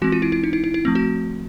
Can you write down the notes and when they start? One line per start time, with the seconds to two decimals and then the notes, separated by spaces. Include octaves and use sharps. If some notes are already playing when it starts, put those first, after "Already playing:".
0.02 E3 G#3 C4 F#4
0.12 F4
0.22 E4
0.32 E4
0.44 D#4
0.53 E4
0.64 E4
0.74 E4
0.85 F3 A3 C4
0.95 F#4